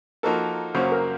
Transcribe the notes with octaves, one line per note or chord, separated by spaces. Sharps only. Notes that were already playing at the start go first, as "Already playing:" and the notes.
F3 A#3 D#4 F#4 A4 A#4
F#2 C#3 F#3 A#3 C5
A#4